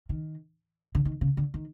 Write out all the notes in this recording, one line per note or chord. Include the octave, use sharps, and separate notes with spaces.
D#3
D3
D#3
C#3
D3
D#3